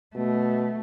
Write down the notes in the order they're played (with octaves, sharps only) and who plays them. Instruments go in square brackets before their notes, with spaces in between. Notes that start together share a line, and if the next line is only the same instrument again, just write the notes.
[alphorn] B2 [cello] A3